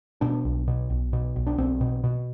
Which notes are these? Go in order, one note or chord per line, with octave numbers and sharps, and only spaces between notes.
B2 D4
B1
B2
B1
B2
B1
D4
B1 C4
B2
B2